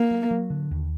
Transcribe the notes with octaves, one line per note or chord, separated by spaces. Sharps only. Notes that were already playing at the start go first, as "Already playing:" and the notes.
Already playing: A#3
F#3
F#3
D3
D#2